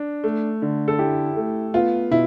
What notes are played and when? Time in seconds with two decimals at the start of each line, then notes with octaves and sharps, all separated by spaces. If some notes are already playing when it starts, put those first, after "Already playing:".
Already playing: D4
0.24 A3
0.62 D3
0.88 A4
0.99 E4 G4
1.37 A3
1.74 B3 F4
2.11 B2 E4